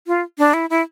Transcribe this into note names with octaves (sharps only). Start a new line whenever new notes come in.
F4
D4
E4
E4